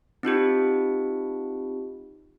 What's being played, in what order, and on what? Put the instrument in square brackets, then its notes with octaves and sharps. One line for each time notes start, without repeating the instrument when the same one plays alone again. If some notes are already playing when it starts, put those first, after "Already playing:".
[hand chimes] C4 D#4 F4 G4